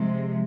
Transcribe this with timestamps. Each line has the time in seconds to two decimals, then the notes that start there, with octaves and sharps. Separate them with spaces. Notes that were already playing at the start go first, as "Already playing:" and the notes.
Already playing: C3 F3 G#3